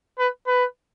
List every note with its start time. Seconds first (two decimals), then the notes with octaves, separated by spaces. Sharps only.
0.19 B4
0.47 B4